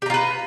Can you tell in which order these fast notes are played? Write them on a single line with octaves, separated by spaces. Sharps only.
G4 A#5 F4 B4